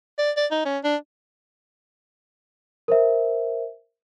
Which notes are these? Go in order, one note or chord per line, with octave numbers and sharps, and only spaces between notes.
D5
D5
D#4
C#4
D4
A#4 C5 E5